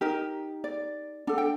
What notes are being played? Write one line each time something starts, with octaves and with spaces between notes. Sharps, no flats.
D#4 G4 A#4 D#5
D5
D4 A4 F#5
G5